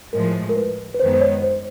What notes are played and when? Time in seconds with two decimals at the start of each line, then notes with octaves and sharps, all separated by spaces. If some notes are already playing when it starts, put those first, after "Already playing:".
0.13 A2 F3 G#3 A#4
0.49 A#4
0.56 B4
0.94 B4
0.99 F#2 D#3 G#3 B3 C5
1.13 C5
1.21 C#5
1.42 C5